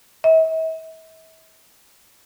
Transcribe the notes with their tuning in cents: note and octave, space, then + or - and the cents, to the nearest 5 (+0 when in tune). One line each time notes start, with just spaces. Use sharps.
E5 -45